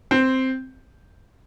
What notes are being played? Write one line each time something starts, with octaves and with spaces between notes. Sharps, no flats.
C4